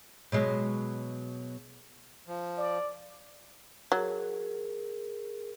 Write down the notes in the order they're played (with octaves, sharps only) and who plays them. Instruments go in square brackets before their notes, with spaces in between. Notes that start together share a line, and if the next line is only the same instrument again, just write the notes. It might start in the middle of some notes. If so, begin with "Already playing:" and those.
[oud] B2 F#3 G#3
[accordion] F3
[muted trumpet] D5
[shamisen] F#3 [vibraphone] G#4 A#4